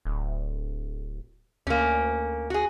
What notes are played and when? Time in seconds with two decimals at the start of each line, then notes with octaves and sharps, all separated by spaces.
0.05 D1
1.67 D2 A#3 C#4
2.50 F#4 G#4